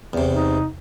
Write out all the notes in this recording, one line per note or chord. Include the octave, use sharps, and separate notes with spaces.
E2 C3
D#4